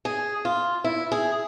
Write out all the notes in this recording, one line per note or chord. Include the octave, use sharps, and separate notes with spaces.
G#4
F4
E4
G#4